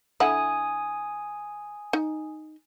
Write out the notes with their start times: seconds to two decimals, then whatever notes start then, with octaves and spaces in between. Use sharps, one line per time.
0.20 D3 E4 F#5 G#5 D#6
1.93 D#4